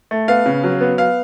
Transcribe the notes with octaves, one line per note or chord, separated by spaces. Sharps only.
A3
B3 F5
C#3
F#3
B3
B3 F5